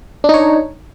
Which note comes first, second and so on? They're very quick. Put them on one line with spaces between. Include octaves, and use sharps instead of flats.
D4 D#4 C#5